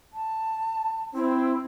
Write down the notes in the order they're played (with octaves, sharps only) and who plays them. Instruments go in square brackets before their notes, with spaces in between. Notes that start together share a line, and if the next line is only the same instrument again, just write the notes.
[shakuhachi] A5
[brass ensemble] C4 [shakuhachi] E4